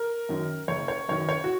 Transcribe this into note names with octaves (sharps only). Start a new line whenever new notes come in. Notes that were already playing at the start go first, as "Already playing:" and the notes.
Already playing: A#4
F#2 D#3
F#1 C#5
C#5
F#2 D#3 C#5
C#5
F#4